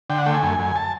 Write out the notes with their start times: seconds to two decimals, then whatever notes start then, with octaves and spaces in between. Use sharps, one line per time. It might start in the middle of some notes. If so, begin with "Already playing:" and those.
0.10 D3 G5
0.18 F#5
0.26 A3 G5
0.34 G#5
0.43 F#2
0.59 F#2
0.76 A5